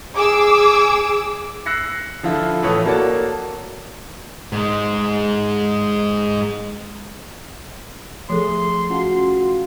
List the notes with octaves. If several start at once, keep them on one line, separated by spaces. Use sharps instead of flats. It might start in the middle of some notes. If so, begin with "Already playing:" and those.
G#4 D6 E6
E6 F#6 A#6 C7 C#7
D3 F3 E4 F4
A2 E3 A4 C#5 D#6
A#3 F#4 A4 C#5 D5 A5
G#2 G#3
F3 A3 G#4 A4 C6
C#4 F4 F#4 F5 F#5